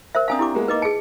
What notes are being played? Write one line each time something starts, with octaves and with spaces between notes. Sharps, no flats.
A#4 C5 E5
C4 D4 F5 G#5 A#5 D#6
E4 G4 D6
G#3 A#3 B3
A#3 D#4 B4 D#5 D6
G#4 A5 C#7